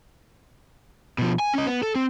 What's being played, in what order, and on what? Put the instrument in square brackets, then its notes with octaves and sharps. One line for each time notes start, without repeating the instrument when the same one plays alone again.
[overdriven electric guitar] B2 F3
G#5
C#4 D#5
B3
A4
C4